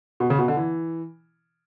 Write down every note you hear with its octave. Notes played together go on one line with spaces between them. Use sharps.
B2
C#3
B2
D3
E3